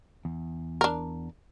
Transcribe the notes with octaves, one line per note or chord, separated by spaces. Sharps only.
E2
D4 A#4